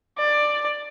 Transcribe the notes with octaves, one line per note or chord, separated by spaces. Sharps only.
D5